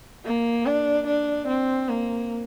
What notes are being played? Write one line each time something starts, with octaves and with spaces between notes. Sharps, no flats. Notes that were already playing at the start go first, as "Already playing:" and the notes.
A#3
D4
D4
C4
A#3